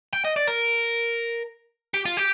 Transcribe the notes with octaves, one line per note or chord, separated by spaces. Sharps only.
G5
D#5
D5
A#4
G4
F4
G4